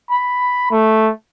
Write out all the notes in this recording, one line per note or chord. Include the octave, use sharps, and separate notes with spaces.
B5
A3